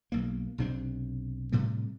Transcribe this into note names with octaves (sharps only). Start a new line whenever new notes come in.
B1 A#3
B1 C3 C4 D4
A2 C3 G3